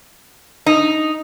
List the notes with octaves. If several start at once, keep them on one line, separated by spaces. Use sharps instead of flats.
D#4